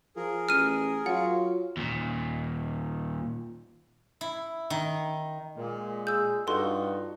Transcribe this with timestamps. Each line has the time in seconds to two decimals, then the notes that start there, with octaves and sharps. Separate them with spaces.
0.16 F3 G#4 A#4
0.49 A1 F6 D#7
1.06 F#3 F4 F#5
1.77 D#2 A#2
4.21 E4
4.70 D#3
5.56 A#2 G#3
6.07 G#4 E6 G6
6.47 G2 D#4 F4 F#4 A4 C6